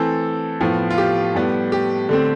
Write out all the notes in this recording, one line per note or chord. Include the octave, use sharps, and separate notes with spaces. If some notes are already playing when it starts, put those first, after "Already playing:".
Already playing: E3 A3 C4 A4
A2 F3 B3
F4
G4
A2 G3 B3
G4
D3 A3 C4